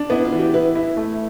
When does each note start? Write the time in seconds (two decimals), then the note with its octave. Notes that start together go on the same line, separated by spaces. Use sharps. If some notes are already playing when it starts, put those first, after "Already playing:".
Already playing: D4
0.10 B3 E4
0.25 F4
0.32 E3
0.39 G4
0.54 E4 B4
0.75 E4
0.97 A3